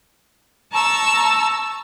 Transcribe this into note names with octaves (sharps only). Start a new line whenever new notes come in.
A5 A#5 C#6 E6